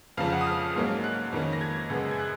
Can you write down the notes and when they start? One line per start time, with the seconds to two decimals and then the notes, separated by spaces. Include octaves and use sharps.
0.17 F2 C#3 F3 F5
0.33 F#5
0.41 D#6
0.47 F6
0.76 G#2 F#3 A#3 C#4
1.04 F#6
1.33 F2 D#3 A#3 C#4
1.53 A#6
1.61 G#6
1.90 F#2 C#3 G#3 B3
2.11 G#6
2.19 F#6